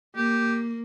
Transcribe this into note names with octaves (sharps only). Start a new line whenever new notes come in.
A#3 G4